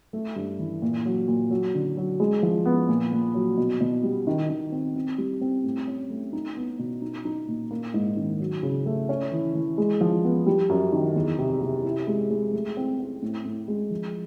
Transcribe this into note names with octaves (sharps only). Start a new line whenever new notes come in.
A3
G2
E3
A#2
F#3
A#2
F#3
D3
F#3
G#3
F3
B3
A#2
A#2
F#3
B2
B2
G3
D#3
D#3
C4
C4
G3
C4
A2
C#4
A3
D#4
B3
B2
D#4
D#4
A#2
A#3
G#2
D#3
F#3
C#3
A3
C#4
E3
E3
G#3
F3
B3
G3
F#2
D#3
E2
C3
C3
E4
G#3
G#3
A3
C4
C4
A2
A2
G#3
F3